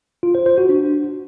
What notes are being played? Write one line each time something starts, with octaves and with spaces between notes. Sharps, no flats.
F4
C5
C5
F#4
D4